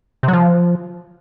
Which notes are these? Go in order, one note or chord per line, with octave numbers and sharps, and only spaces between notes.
C3
F#3
F3